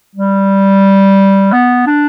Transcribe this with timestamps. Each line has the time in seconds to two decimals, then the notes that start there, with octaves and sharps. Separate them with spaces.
0.15 G3
1.52 B3
1.87 D4